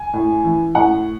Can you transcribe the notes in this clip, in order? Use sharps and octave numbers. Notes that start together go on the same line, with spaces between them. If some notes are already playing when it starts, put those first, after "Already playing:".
Already playing: G#5
A2
E3
A2 F#5